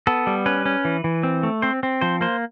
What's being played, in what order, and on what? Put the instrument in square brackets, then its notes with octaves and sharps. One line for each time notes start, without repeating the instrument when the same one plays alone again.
[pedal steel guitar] B3 A4
G3
C#4 B4
C#4
E3
E3
C4
A3
C4 C5
C4
F3 C5
A#3 C5